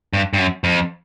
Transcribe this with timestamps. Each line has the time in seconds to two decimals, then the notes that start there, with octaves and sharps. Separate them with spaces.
0.13 G2
0.33 G2
0.38 F#2
0.64 F2